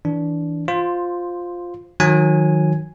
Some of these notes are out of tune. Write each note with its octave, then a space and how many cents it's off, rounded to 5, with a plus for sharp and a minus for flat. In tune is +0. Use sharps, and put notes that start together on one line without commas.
E3 -20 D4 -15
F4 +10 C5 +0
D#3 +0 F#3 -30 G#5 +0